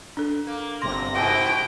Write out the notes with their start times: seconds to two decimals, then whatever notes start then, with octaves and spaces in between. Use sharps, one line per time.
0.17 D4 A4
0.47 A#3
0.82 G1 C3 C6 A#6
1.15 G#2 B2 E3 G5